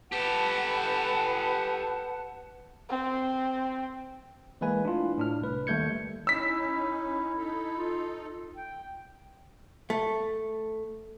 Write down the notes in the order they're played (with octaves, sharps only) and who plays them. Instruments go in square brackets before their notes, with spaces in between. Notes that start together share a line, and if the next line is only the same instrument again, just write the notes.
[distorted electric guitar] G4 A4 [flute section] B4 F#5 A5
[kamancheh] C4
[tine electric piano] E3 G#3 A#3 B4 G#5
A3 D4 E4 F4
A2 D4 F6
C2 B4
D#2 G3 A3 G6 G#6 C#7
[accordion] C#4 D#4 [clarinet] E4 [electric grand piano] E6 B6
[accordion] D#4 A4
[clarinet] F4
G5
[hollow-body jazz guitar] A3